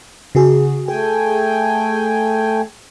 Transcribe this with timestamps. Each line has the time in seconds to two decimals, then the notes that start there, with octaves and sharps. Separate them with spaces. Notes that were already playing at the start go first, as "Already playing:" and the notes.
0.35 C#3 F#4 G#4
0.88 A3 G#4 G5 G#5